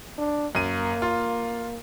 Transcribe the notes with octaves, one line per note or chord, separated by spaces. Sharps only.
D4
F#2 A#3 D#7
F4